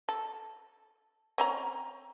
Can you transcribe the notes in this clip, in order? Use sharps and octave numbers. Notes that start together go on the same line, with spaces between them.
A4
C4 C#4 A#5